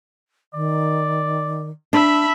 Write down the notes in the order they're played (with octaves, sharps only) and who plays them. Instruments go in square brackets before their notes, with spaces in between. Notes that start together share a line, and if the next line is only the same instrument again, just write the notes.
[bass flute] D#3 [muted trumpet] D5
[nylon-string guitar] D4 [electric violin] E5 B5